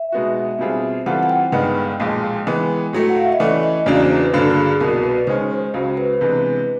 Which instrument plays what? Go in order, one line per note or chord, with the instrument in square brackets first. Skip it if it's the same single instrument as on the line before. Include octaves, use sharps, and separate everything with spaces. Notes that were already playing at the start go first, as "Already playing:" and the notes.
Already playing: [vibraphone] E5
[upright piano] B2 G#3 B3 D#4 F#4
B2 G3 C4 F4 G#4
[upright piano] E3 G3 C4 F4 A4 [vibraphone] F#5
[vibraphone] F#5
G5
[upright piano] G1 G2 D#3 G#3 B3 [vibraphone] G5
[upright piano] B1 A#2 F3 G#3
E3 G#3 B3
A2 F#3 A3
[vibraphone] F#5
F5
E5
D#5
[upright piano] E3 A3 C#4 [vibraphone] D5
[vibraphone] D#5
[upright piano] E2 C#3 F#3 A#3 D4 [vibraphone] D5
[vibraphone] C5
B4
[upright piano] G2 D3 F#3 A#3 D4 [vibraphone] A4
[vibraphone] G#4
[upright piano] C2 B2 F#3 [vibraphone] A#4
[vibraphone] B4
[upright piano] D#3 G#3 C#4 [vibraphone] C5
[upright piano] C#2 C#3 F#3 [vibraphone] C5
[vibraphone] B4
[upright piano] C3 E3 G#3 B3 D4